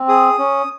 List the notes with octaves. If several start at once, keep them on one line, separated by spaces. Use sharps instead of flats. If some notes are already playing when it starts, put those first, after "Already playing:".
Already playing: C4
G#4 D#6
C#4